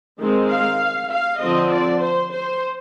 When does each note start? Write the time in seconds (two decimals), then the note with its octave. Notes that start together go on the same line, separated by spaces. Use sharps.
0.19 D#3 G#3 C4
0.50 F5
1.11 F5
1.41 D3 F3 C4 D#5
1.71 D5
2.02 C5
2.33 C5